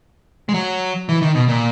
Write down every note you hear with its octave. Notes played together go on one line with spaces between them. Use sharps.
G#3
F#3
E3
D#3
B2
A#2